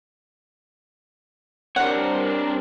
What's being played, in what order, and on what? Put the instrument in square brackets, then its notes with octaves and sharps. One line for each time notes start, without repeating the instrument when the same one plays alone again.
[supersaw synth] G3 C4 A#4 [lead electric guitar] D4 C#5 [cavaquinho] F#5